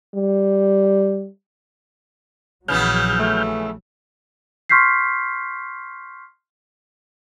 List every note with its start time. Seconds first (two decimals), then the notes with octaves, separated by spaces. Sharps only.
0.15 G3
2.68 A#1 C#3 E3 F#3 B3 F6 G6
3.20 A3
4.69 C6 C#6 F6 G6 B6 C7